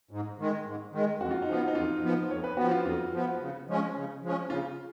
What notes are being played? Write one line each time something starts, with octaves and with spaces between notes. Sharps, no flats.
G#2
D#3 G#3
G#2
D#3 G#3
F2 F#4
F4
D#4
F3 B3 F4
D#4
F2 F4
F3 B3
F2 C#5
B4
F3 B3 F#4
F4
F2 F4
F3 B3
C#3
F3 G#3 C#4
C#3
F3 G#3 C#4
C#3 F4